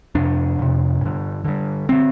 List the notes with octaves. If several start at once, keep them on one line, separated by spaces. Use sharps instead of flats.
F2 C3 D4
F2 C3
G2 D3
G2 D3
D3 C4